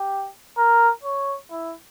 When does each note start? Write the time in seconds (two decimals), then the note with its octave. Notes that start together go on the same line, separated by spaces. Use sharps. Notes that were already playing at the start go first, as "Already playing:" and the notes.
Already playing: G4
0.57 A#4
1.03 C#5
1.51 E4